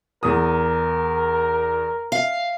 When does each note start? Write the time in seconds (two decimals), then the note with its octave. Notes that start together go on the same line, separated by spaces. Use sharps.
0.23 E2 A#4 D#6
2.12 F5